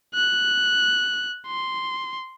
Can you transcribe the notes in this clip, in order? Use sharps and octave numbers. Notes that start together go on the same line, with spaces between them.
F#6
C6